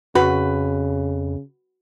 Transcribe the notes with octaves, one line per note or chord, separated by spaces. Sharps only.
F2 C#3 F#4 B4